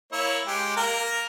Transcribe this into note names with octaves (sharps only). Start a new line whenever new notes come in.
A#3 E4 C#5
G#3 G4
A#3 A#4